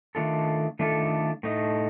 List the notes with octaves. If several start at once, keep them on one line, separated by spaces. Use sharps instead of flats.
D#3 A3 D4 F4 A4
D#3 A3 D4 F4 A4
A2 A3 D#4